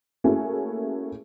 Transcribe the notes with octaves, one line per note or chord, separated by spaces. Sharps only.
A3 A#3 C#4 E4 F#4 G#4